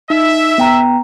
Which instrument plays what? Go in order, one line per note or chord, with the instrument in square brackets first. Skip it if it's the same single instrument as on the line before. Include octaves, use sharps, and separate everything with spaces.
[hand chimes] D#4 [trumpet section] E5
[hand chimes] B3 G5 A#5